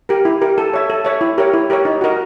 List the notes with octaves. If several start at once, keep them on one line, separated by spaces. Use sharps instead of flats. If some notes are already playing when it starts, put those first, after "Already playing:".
G4 A#4
E4
G4 A#4
A4
C#5 E5
A4
C#5 E5
E4
G4 A#4 C#5
E4
G4 A#4 C#5
D#4
F#4 A#4 D#5